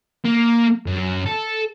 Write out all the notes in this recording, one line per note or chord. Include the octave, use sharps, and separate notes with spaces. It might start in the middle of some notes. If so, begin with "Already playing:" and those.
A#3
F#2
A4